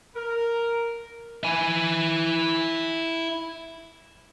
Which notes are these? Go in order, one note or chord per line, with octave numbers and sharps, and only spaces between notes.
A#4
E4 G#5